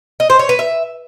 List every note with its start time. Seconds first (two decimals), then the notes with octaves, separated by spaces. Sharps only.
0.20 D#5
0.30 C5
0.39 C#5
0.49 B4
0.59 E5